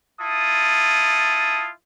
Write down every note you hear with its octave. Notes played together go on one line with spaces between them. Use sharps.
E4 F4 A5 D#6